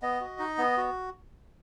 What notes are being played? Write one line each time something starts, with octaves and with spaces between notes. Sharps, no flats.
B3 D#5
F#4
D#4
B3
F#4